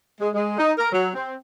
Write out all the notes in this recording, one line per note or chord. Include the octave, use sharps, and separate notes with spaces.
G#3
G#3
D#4
A#4
F#3
C4